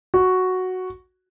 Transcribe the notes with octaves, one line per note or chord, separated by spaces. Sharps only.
F#4